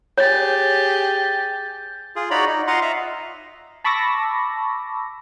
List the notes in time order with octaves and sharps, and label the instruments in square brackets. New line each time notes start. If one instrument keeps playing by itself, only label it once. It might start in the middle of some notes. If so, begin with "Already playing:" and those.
[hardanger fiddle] G4 G#4 [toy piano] C#5 [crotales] G6 A6
[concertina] F4 G#4
D#4 F#4 C#5 D5 A#5 B5
D#4
F4 D#5 F5 F#5 A#5 C6
D#5 E5 A#5
[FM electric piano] A5 B5 C#6 D6 E6 A#6